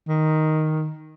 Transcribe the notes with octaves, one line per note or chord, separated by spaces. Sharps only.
D#3